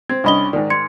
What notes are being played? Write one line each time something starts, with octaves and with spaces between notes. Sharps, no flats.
C4 G#6
C2 C#4 D4 D#5 B5 G7
G#2 D#3 D5
C6 G#6 C#7